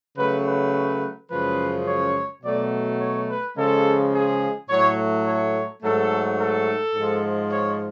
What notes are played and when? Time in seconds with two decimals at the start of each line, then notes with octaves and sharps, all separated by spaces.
0.16 C#3 F#3 A3 B4
0.45 B4
1.30 F#2 C#3 F3 G#3 B4
1.86 C#5
2.43 B2 F#3 A3 D5
3.00 C#5
3.28 B4
3.56 C#3 F3 G#3 A4
4.13 G#4
4.69 A2 F#3 A3 C#5
5.26 C#5
5.82 G#2 F#3 A3 A4
6.39 A4
6.95 G#2 F3 G#3
7.51 C#5